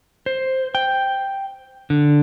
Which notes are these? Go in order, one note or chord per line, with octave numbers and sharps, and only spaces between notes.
C5
G5
D3